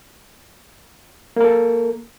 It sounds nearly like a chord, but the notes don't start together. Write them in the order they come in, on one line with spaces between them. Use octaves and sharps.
A#3 A#4 A4